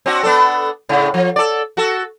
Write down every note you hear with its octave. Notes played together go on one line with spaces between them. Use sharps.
C4 D4 F#4
B3 D4 A4
A2 C#3
F3
A4 D5
F#4 A4